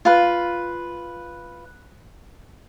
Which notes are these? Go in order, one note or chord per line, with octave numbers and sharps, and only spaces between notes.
F4 B4